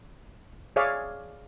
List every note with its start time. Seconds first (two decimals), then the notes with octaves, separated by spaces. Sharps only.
0.76 G#4 C#5 D5 E5 F5